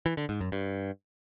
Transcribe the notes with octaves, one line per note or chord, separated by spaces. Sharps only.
E3
D3
G#2
F#2
G2